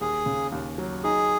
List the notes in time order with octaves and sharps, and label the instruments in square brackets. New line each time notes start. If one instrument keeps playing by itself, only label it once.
[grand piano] D#2 [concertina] G#4
[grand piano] C#3
D#2
F#3
[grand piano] D#4 [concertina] G#4